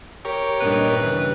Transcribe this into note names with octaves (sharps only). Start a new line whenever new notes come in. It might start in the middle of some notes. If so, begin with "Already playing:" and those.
G4 A#4 C#5
G2 A#2 D#3 B4
C#3 E3